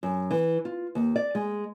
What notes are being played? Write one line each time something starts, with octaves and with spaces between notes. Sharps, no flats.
F#2
E3
F4
D#2
D5
G#3